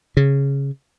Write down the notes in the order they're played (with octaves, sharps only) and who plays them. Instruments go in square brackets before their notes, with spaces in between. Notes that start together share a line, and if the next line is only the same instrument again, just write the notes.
[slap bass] C#3